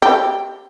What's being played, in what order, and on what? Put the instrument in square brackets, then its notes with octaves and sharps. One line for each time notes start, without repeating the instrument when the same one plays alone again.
[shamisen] G4